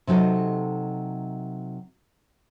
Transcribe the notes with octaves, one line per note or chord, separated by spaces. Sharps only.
C3 F#3 D#4 A4 D#5